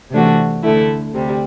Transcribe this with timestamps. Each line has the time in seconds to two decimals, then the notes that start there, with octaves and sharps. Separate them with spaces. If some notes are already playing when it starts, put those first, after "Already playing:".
0.11 C3 E3 A3 D4 F#4
0.62 D2 D3 A3 E4
1.13 D2 C3 G3